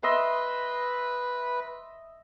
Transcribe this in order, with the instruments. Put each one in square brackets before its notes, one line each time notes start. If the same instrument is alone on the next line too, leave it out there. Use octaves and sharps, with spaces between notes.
[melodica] B4 [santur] D#5 E5 C6